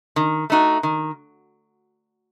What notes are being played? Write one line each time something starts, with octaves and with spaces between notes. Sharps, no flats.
D#3
A3 D#4 F#4
D#3